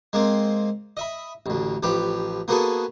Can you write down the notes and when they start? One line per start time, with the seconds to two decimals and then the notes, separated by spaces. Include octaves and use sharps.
0.13 G#3 A#3 C4
0.97 D#5 E5 B5
1.46 A1 D2
1.83 A1 F3 G4 B4
2.48 A#3 B3 F#4 G#4 A4 B4